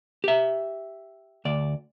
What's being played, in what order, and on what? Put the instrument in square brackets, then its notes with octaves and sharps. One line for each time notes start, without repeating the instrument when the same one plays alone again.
[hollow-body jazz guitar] G4 E5
D2 D5